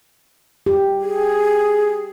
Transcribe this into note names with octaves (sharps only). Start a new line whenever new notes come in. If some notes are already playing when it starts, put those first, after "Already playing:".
G4
G#4